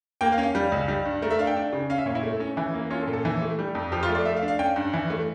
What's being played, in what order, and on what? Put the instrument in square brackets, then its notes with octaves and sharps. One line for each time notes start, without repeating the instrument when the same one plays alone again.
[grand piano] A#3 G5
F5
C#4
F5
G3
C#2
G3
G2
A3 A#4
E5
D4 F5
G5
D4
C#3
C#4 F5
E5
A#2 C#5
E4
A3
C#4
E3
A#3
C#4 F4
A4
A#2
A4
E3
A3
G3
F2
F3 G4
F4
A3
D5
A3 E5
F5
D4
F5
C#4 G5
G2
E3
A3